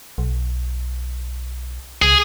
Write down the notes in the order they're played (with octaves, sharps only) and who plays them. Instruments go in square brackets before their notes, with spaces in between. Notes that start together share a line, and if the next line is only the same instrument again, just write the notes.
[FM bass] B1
[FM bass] C#2 [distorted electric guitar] G#4